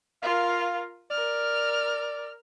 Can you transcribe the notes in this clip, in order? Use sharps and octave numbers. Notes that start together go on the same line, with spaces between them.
F4 A#4 F5
A#4 D5 F6